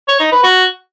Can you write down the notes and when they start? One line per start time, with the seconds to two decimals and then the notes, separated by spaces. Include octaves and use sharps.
0.08 C#5
0.20 D#4
0.32 B4
0.43 F#4